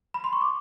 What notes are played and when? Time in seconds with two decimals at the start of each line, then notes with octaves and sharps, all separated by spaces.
0.14 B5
0.24 C6
0.33 C#6
0.41 D6